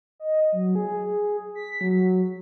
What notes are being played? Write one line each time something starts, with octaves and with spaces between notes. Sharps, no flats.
D#5
F#3
G#4
B6
F#3